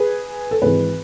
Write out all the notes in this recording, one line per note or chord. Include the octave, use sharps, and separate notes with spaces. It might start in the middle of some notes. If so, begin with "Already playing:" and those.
Already playing: G#4 B4
A4
G#1 G#2 E3 G#4 B4